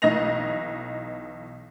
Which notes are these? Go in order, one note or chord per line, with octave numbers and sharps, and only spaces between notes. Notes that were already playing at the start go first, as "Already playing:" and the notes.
B1 E3 D#4 D#5 A#6 F7